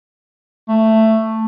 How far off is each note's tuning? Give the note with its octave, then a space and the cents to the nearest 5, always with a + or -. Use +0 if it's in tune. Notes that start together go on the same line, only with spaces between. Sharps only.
A3 +10